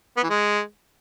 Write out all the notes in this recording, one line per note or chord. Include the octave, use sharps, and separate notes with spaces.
B3
E3
G#3